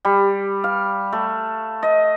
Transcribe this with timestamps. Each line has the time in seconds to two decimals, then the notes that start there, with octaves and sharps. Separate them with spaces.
0.05 G3
0.64 F5
1.12 A3
1.83 D#5